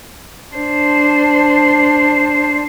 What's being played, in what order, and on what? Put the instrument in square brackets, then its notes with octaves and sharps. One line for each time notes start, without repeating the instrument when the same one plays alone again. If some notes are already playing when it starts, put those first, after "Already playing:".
[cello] D4 C5